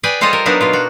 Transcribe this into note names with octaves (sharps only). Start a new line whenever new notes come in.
G#4 B4 D5 G5 G#5
G3 F4 A4 C5 C#5 D#5
A#4
F#3 A#3 B3 D4 D#4
B2 A#3 F4
F#4